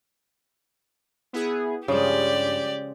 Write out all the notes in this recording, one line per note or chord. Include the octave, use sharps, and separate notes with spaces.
B3 E4 G#4
G2 C#3 F3 G#3 G4 D5